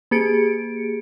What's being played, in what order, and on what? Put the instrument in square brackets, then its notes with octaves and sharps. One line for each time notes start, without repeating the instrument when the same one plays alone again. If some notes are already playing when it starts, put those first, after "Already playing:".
[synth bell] A#3 G4 G#4 C#7 D7